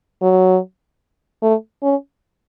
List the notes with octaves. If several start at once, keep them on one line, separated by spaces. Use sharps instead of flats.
F#3
A3
C#4